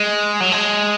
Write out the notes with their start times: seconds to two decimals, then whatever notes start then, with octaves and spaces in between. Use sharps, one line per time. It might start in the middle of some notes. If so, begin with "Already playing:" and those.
Already playing: G#3
0.40 F#3
0.52 G#3